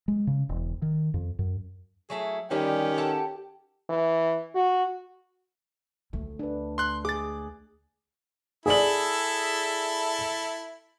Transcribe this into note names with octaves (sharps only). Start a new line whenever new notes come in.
G#3
C#3
E1
D#3
F2
F#2
F#3 A3 E4 G#4
D3 D#3 G3 C#4 G4 G#4
A4 F#5 A5
E3
F#4
D2 A3
D4 B4
C6 F#6
G#4 D6 A6
E4 G#4 A4 D5 F#7